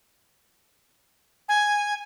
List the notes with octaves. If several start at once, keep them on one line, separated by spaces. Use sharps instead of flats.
G#5